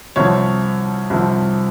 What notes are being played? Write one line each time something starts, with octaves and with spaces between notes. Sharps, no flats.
C2 C3 F3 C#5
C2 C3 F3